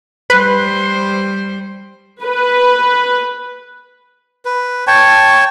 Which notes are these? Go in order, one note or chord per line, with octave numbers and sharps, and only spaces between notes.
G3 B4 C5
B4
B4
C#5 G5 A5 C#6